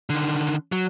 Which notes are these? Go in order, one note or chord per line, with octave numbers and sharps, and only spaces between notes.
D3 D#3
F#3